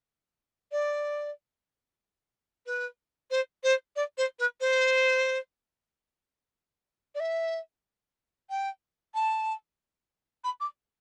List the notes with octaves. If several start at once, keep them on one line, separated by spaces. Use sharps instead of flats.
D5
B4
C5
C5
D5
C5
B4
C5
D5
E5
G5
A5
B5
D6